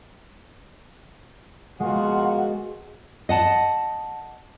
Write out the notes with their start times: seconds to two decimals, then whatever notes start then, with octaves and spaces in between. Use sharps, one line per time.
1.80 B2 G#3 A#3 F4 F#4 F#5
3.29 D#5 F#5 A5